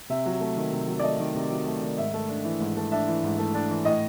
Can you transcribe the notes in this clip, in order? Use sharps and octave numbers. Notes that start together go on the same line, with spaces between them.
C3 E5
F#3
A3
D#3
C3
F#3
D5
A3 D#5
D#3
C3
F#3
A3
D#3
G#2 E5
A3
D4
E3
G#2
A3
D4 E5
E3
G#2
A3
D4
E3
A2 D#5